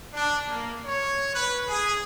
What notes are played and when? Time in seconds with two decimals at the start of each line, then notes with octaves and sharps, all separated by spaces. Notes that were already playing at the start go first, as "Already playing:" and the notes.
0.14 D4
0.48 A#3
0.84 C#5
1.34 B4
1.69 G#4